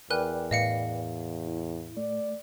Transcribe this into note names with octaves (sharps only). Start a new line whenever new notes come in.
E2 A#4 B4 D5 G5 G#5 F#6
A2 D#5 F5 C#7
E4
A3 D5